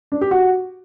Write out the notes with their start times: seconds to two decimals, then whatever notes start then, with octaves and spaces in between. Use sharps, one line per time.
0.12 D4
0.21 G4
0.31 F#4